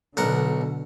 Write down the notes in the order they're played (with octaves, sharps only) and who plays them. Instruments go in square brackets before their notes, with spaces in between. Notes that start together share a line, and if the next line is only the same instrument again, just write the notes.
[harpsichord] B1 A#4 F#5 [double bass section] B2 D3